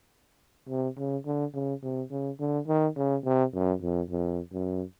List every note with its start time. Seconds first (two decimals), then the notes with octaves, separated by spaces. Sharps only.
0.69 C3
0.98 C#3
1.26 D3
1.54 C#3
1.83 C3
2.11 C#3
2.40 D3
2.68 D#3
2.96 C#3
3.24 C3
3.54 F#2
3.82 F2
4.10 F2
4.52 F#2